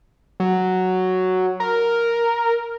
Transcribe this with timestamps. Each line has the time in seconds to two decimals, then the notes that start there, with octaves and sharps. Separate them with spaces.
0.40 F#3
1.60 A#4